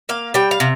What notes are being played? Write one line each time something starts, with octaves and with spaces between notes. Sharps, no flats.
A#3 F5
G3 G5
F5
C3